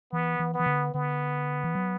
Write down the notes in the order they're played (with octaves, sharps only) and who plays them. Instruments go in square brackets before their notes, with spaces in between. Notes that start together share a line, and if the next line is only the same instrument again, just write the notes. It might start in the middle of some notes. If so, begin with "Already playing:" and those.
[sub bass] E3 [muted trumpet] B3
[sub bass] E3
[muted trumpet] B3
[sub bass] E3
D3
[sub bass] D3 [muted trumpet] B3
[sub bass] E3
F#3